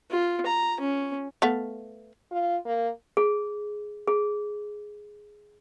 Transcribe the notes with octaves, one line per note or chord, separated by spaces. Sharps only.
F4
A#5
C#4
A3 B3 F5
F4
A#3
G#4
G#4